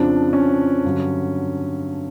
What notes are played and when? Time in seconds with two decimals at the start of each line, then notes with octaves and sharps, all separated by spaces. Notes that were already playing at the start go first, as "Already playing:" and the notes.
Already playing: F2 C#3 F3 D4
0.33 C#4
0.85 G2 D3 F#3